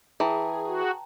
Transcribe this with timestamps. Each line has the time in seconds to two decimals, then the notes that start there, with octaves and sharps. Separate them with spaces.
0.20 E3 G#4 G5 A5 A#5
0.67 F#4